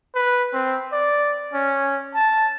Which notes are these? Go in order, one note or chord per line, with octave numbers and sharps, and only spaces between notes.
B4
C4
D5
C#4
A5